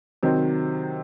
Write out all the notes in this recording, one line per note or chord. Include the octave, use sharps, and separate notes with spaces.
C3 D#3 F#3 C4